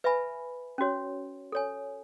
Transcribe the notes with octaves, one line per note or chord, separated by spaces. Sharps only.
B4 E5 G#5 B5
C#4 F#4 C#5
A4 C#5 G#5